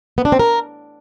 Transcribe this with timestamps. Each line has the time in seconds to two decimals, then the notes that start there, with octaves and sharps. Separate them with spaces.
0.18 B3
0.25 D4
0.32 C4
0.39 A#4